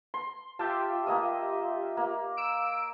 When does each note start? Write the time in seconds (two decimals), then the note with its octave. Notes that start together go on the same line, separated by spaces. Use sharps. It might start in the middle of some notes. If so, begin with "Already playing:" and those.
0.14 C6
0.59 F4 G4 E5 A5
1.07 A#3 D#5 D#6
1.97 A#3
2.37 E6 D7